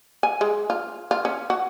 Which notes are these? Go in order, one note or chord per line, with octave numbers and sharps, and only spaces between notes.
G#5
G#3
F4
F4
C#4
F#4